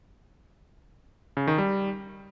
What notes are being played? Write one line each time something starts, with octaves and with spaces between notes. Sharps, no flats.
C#3
D#3
G3